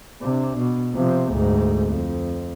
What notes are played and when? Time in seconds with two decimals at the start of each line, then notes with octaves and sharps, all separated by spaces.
0.21 C3 D4
0.58 B2
0.94 C3 F3
1.31 D2 G#2
1.89 F2